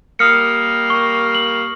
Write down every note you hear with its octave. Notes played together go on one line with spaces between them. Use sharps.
G3 A#3 D#6 F6 C#7
C#6
F#7